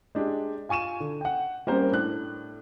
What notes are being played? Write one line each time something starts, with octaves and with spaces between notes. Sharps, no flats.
G#3 D4 G4
F4 G#5 C#6 D#7 E7
D3
F#5 G5
G3 A#3 C4 C#4 A#4 C5
A2 D4 F#6